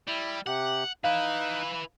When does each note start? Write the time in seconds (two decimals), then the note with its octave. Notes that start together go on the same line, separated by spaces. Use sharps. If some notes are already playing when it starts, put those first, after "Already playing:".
0.08 G3 E4
0.46 C3 G4 F#5
1.04 D#4 E4 B4 F5 F#6